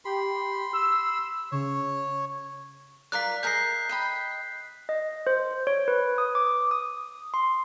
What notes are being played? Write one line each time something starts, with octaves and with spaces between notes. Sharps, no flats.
G4 B5 C6
E6
C#3 C#5
F4 A#4 D5 F#6 B6
G#4 A#4 D#5 G6 C7
D#5 G5 B5
D#5
C5
C#5
B4
D#6
D6
D#6
C6